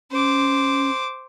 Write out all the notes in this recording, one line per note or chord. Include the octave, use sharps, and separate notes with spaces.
C#4 C5 D6